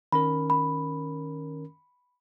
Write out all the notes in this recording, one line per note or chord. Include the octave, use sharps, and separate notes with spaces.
D#3 C#4 A#4 B5
B5